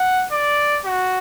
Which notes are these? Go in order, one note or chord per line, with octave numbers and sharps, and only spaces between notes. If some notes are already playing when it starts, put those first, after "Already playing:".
Already playing: F#5
D5
F#4